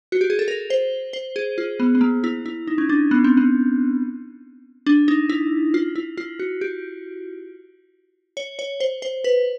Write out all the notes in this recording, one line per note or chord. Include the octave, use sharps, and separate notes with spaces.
F#4
G4
G#4
A4
A#4
C5
C5
G#4
F4
B3
B3
A#3
E4
E4
D#4
C#4
D4
B3
C4
B3
D4
D#4
E4
F4
E4
F4
F#4
G4
C#5
C#5
C5
C5
B4